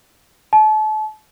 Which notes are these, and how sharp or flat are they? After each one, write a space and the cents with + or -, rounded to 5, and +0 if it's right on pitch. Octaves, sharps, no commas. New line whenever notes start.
A5 -35